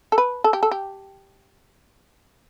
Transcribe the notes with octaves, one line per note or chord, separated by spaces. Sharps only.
A4
B4
A4
G4
A4
G4